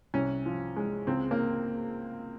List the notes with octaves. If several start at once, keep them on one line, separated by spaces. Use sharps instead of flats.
C2 C#4
F3
G#3
C#2 C4
A#3